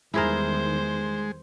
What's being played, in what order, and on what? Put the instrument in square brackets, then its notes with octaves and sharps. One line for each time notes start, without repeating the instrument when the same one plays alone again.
[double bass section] E2 D#3 G3 [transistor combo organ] G#3 [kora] E4 G#4 A#4 [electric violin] C5